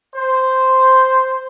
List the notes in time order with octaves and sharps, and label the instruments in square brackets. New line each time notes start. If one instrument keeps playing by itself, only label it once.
[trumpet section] C5